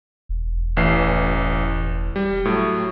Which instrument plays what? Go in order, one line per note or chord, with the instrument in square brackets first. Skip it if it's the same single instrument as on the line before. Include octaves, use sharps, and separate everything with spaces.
[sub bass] E1
[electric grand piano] A1 E3 C7
G3
A2 F#3